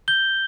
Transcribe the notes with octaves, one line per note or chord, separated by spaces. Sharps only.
G6 G7